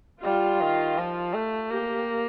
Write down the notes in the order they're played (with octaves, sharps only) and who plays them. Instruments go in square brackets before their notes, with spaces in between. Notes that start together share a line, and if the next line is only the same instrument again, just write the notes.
[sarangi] G3 [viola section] F4
[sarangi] D#3
F3
A3
[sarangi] A#3 [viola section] G4